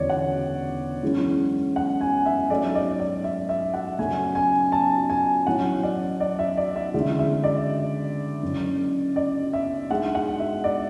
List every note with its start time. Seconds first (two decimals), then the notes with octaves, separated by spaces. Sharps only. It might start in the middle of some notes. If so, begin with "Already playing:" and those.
Already playing: E1 D2 C#3 E3 B3 C#5 D5
0.09 F#5
1.03 F#2 E3 G#3 C#4
1.76 F#5
2.01 G#5
2.26 E5
2.50 G#2 F#3 A3 C#4 D5
2.75 D5
3.00 D5
3.24 E5
3.49 E5
3.74 F#5
3.98 F#2 C#3 F#3 A3 C#4 G#5
4.35 G#5
4.72 A5
5.10 G#5
5.46 A1 A2 F#3 C#4 F#5
5.83 D5
6.20 D5
6.39 E5
6.57 D5
6.76 E5
6.94 D2 C#3 E3 G#3 D4
7.19 E5
7.44 D5
8.42 F#1 F#2 C#3
9.16 D5
9.53 E5
9.90 G#2 G#3 D4 F#5
10.15 F#5
10.40 E5
10.64 D5